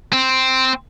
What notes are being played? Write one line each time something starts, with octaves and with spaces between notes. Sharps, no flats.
C4